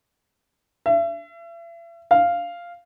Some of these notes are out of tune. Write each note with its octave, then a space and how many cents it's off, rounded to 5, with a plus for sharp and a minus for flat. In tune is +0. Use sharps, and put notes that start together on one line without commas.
E5 +40
F5 -5